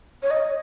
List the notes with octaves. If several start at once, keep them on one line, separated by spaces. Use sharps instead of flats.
C#5
D#5